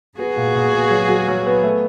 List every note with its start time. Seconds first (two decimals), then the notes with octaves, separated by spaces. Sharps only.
0.18 B3 F#4 G#4
0.37 A#2
0.55 A#2
0.73 B3
0.91 F#3
1.09 F#3
1.28 F#3
1.46 B3
1.63 A3